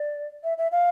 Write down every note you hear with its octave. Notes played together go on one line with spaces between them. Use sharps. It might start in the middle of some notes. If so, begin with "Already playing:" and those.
Already playing: D5
E5
E5
F5